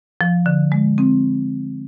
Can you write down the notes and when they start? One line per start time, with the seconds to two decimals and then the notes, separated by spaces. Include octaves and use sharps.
0.21 F3
0.46 D3
0.72 G#3
0.98 C4